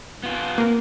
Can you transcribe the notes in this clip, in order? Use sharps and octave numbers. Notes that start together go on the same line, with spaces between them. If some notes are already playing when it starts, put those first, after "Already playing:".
B3 F4
A#3 A#4